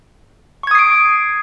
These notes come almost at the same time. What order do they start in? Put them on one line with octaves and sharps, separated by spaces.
C#6 G#6 D#6 C7 D7